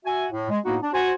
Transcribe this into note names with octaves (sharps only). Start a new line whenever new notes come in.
F#4 E5 G#5
A2
G#3
A2 A#3 B3 D#4 F#4
D4
F#4 C5 G#5